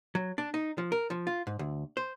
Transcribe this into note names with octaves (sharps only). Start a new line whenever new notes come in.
F#3
D4
D#4
F3
A#4
F3
F4
G#2
D2
C5